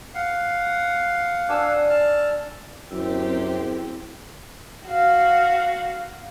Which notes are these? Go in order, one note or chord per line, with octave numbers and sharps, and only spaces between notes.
F5 F#5
D4 G#5 E6
A5 F6
F#2 C4 E4 G4
E4 G#4
F#4 F5